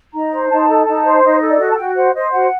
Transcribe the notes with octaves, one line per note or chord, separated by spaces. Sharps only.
D#4 A#5
C5
D#4 A5
A4
D#4 A5
C5
D#4 D#5
A4
D5
F#4 D#5
A5
F#4 G5
C5 F#5
C5 D#5
F#4 F#5